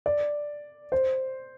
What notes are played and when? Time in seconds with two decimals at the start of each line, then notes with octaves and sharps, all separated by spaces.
0.06 D5
0.92 C5